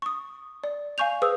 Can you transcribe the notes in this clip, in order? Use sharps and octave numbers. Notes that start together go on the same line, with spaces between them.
C#6 D#6
D5
F5 G#5 C#6 G6 F7
G#4 B4 C5 D#6 E6